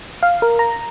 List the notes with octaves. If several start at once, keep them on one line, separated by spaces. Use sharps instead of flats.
F5
A#4
A#5